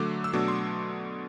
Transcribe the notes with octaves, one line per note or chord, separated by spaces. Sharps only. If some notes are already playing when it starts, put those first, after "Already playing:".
Already playing: D3 F#3 A3 D6
E6
B2 F#3 A3 D4 D6
C6